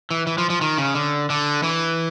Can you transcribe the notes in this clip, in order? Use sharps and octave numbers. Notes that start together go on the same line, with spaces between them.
E3
E3
F3
F3
D#3
C#3
D3
D3
E3